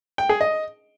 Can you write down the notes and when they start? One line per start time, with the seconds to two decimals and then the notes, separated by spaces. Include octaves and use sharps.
0.18 G5
0.29 G#4
0.41 D#5